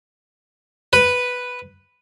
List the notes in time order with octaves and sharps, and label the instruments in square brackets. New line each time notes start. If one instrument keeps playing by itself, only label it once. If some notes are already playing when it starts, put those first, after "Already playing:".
[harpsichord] B4